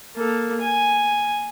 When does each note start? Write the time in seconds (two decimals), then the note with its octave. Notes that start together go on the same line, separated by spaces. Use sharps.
0.17 A#3 A4
0.61 G#5